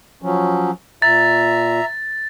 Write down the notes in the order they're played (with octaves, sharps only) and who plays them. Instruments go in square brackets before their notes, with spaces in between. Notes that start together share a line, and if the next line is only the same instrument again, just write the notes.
[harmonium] F3 F#3 C#4
[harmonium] A#2 [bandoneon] E5 A#5 [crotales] A6